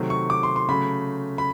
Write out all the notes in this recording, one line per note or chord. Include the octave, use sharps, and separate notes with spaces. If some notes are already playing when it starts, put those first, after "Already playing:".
Already playing: C3 D#3 F#3 A3
C#6
D6
C6
C6
C#3 F#3 A3 B5
B5